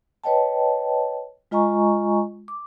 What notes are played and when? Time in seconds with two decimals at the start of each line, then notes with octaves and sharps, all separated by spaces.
0.24 B4 C#5 D#5 G5 A5
1.51 G#3 F4 D#5 G#5 A#5 C#6
2.48 D6